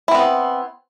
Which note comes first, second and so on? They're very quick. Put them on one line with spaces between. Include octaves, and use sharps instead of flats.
E4 C4 B3